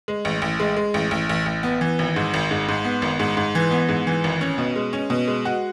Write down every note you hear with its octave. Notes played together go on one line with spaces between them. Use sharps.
G#3
A1
A1
G#3
G#3
A1
A1
A1
A1
B3
E3
G#1
G#2
G#1
G#2
G#2
B3
G#1
G#2
G#2
E3
B3
G#2
E3
G#1
C#4
B2
G#3
C#4
B2
G#3
F#4